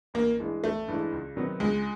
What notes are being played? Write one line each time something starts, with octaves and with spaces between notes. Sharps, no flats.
A1 A#3
G2 E3 G#3
A1 A3
G2 E3 G#3
C#2
C3 D#3 F#3 B3
C#2 G#3